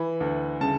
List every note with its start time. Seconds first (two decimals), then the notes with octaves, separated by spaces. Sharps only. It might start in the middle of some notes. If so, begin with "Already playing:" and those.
Already playing: E3 B5
0.20 D2
0.61 C#3 A5